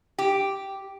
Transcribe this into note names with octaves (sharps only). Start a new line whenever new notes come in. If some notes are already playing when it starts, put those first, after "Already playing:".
G4